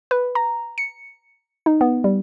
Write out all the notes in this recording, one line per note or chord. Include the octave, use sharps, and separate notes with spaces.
B4
A#5
C#7
D#4
B3
G3